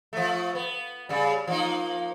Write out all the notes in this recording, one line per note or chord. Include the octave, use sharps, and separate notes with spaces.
F3 A3
B3
C#3 G3
F3 A#3 D#4